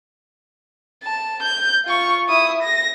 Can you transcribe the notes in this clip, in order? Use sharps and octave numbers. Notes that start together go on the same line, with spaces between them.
A5
G6
F4 C#6
E4 D#6
A#6